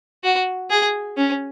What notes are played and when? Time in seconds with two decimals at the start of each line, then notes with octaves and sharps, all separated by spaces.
0.24 F#4
0.70 G#4
1.17 C#4